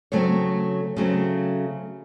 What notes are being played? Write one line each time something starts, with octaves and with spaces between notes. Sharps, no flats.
C#3 F#3 A3 C4 C#5
C#3 F#3 A3 C4